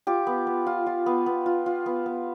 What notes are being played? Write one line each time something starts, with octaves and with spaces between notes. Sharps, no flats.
F4 G4
B3
B3
F4
F4
B3
B3
F4
F4
B3
B3